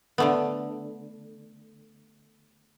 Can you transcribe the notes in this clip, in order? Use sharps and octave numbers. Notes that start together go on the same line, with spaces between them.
D3 A3 B3